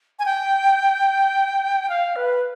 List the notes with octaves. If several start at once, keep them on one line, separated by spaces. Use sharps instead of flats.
G#5
G5
F5
B4